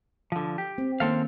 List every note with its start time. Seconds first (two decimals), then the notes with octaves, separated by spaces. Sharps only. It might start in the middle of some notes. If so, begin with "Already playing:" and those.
0.32 D3 F3
0.58 G4
0.78 C4
1.00 D#3 A#3 C4 C#4 A4 F5